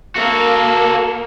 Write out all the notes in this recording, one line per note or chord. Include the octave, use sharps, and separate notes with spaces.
A#3 F#4 A4